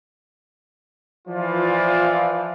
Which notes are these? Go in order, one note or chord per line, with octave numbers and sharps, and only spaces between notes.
E3 F3 F4 D5